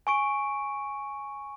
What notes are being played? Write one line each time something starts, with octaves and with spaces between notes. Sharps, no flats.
G#5 C#6 D7